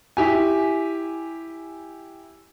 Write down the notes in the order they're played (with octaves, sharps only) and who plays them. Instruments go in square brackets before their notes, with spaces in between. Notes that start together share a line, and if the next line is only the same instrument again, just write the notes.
[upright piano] E4 G4 G#5